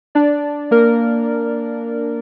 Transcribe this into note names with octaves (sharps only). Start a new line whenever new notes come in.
D4 D5
A#3 A#4